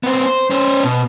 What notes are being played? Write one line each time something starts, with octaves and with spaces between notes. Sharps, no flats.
B3 C4
C5
C#4 C5
B2